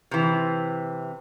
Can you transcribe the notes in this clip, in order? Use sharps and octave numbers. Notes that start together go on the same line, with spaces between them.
C3 E3